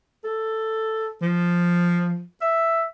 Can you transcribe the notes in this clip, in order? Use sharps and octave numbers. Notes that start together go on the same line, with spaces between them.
A4
F3
E5